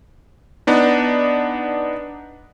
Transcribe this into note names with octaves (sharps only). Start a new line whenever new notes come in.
B3 D4 D#4